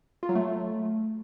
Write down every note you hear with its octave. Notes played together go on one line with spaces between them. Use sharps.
F4
F#3
A3